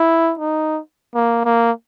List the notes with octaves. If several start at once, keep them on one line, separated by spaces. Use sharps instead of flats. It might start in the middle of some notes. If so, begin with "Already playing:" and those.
Already playing: E4
D#4
A#3
A#3